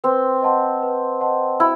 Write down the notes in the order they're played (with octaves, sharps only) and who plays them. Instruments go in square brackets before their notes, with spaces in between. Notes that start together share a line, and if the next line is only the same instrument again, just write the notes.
[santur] C4 [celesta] B4
[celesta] D#5 F#5 A5 C6
B4
D#5 F#5 A5 C6
[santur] E4 [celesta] F#4